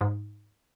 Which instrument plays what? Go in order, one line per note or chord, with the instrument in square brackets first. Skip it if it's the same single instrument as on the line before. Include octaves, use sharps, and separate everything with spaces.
[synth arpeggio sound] G#2